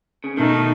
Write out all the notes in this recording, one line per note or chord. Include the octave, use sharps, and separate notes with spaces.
C#3
B2 D#3 A3 D#4